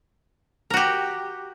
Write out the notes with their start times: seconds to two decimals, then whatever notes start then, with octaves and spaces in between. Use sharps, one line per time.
0.70 A#4
0.74 F#4
0.77 G4